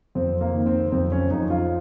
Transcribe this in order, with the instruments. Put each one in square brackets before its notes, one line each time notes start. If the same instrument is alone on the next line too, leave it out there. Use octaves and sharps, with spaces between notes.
[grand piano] F2 C4
A#3
D#3
C4
F2 C4
C#4
F2 D#4
F4